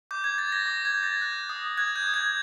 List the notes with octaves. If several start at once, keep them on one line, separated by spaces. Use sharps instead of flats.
D6 G6
G#6
G6 A6
A#6
D6 A#6
G#6
G6
A6
F#6
D#6
F#6 G#6
G6
D#6
G#6